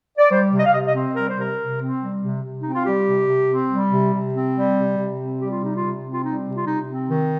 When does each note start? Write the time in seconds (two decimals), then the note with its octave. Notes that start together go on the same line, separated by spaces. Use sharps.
0.18 D5
0.31 G3 C5
0.52 C3
0.59 D#5
0.66 F5
0.73 C3 D#5
0.87 D#5
0.94 C4
1.15 G3 A#4
1.29 C5
1.37 C3 A#4
1.58 C3
1.80 C4
2.01 G3
2.21 C3
2.43 C3
2.61 C4 D#4
2.74 F4
2.86 G3 G4
3.07 C3
3.27 C3
3.48 C4
3.71 G3
3.91 C3
4.12 C3
4.33 C4
4.54 G3
4.76 C3
4.97 C3
5.19 C4
5.39 G3 G4
5.51 F4
5.61 C3 D#4
5.77 F4
5.83 C3
6.03 C4
6.13 F4
6.24 G3 D#4
6.46 C3
6.57 F4
6.67 C3 D#4
6.88 C4
7.10 D#3